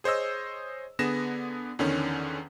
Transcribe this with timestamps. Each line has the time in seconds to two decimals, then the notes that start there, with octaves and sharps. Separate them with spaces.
0.04 G#4 C5 C#5 D#5 E6
0.99 D3 B3 G#4 A#6 E7
1.79 E2 D3 D#3 C#4